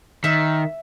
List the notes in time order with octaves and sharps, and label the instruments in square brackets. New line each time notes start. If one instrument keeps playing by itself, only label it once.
[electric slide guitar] D#3 [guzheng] E5